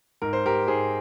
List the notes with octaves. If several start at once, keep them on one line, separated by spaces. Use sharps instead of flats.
G#2 A#4
C5
G4 A#4
G#2 G#4 C5